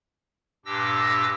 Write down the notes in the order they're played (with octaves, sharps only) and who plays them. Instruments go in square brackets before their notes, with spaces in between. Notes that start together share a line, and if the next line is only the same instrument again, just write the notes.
[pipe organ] G2 A#2 D4 G4 E6 A#6